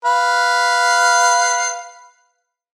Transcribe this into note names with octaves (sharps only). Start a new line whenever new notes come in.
B4 F5